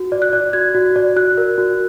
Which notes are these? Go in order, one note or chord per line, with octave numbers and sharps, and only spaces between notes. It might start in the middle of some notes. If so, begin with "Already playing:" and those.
Already playing: F#4
D5
F#6
D5
F#4 G#6
F#4
D5
F#4 F#6
A#4
F#4